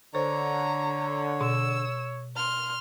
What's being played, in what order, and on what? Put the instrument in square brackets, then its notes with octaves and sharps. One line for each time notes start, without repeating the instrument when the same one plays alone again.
[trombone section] D3 [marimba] C5 [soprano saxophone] C#5 [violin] A#5
[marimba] B2 [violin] E6
[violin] C6 F6